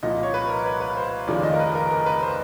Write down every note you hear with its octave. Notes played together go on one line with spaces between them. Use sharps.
C2 A#2 F3 D#5
C#5
B4
A#4
B4
B4
C5
F1 D#2 C#3 F3 D5
D#5
A#4
B4
A#4
A#4
B4
C5